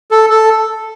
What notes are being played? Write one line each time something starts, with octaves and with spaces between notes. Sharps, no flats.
A4
A4